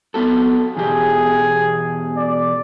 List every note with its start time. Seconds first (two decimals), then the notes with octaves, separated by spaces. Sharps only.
0.14 B3 F#4 A4
0.77 E2 B2 G4 G#4
2.17 D5